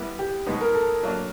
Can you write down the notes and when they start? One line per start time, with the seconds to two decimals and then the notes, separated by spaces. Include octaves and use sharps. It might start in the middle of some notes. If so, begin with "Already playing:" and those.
Already playing: G3 B3 E4
0.19 G4
0.46 B2 G#3 B3 D#4
0.61 A#4
0.75 A4
1.03 F#3 A#3 D4